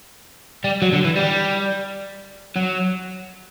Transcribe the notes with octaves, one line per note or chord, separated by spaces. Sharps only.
G3
F#3
D3
E3
G3
F#3